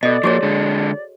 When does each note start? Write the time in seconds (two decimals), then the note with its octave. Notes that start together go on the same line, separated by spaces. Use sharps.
0.03 B2 A4 D5 D#5
0.24 F3 A#3 F#4 G#4 C#5
0.43 D3 G#3